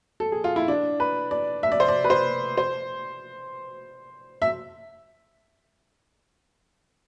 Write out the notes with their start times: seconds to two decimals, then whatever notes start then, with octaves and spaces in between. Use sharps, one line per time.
0.20 A4
0.32 G#4
0.44 F4
0.56 E4
0.68 D4
1.00 B4
1.31 D5
1.63 E5
1.72 D5
1.80 C5
1.88 D5
2.04 B4
2.10 C5
2.57 C5
4.42 E5